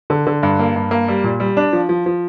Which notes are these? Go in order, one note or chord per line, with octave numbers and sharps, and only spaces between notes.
D3
D3
G2
A#3
G2
A#3
G3
A#2
G3
D4
F3
F3
F3